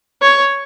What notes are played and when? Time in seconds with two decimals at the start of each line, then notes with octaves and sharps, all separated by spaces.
0.22 C#5